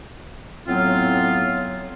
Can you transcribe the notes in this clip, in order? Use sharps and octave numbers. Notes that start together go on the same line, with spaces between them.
A2 F#3 B3 C4 F4